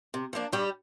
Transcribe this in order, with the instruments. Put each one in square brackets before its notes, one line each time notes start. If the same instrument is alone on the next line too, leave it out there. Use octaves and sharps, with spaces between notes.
[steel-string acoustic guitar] C3
F3 A#3 D4
G2 G3 G4